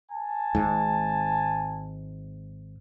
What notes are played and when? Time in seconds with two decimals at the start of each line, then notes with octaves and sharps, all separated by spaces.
0.11 G#5 A5
0.55 G#1 G#2